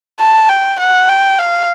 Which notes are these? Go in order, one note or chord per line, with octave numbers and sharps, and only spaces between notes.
A5
G5
F#5
G5
F5